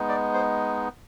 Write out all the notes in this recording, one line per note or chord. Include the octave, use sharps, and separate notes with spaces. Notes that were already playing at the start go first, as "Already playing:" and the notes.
Already playing: G#3 B3 D#4
D5
C5